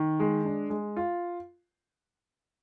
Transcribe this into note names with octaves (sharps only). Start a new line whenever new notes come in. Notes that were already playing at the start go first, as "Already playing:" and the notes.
Already playing: D#3
G#3
D4
G#3
F4